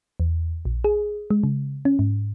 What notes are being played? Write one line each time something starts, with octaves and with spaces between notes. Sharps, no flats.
E2
A#1
G#4
G#3
C#3
C#4
G#2